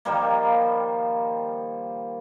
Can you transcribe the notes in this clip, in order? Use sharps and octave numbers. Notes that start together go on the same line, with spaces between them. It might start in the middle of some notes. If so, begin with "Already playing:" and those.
D#3 F3 G3 A#3